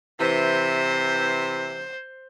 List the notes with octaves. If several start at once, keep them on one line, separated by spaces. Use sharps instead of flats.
C3 E3 C5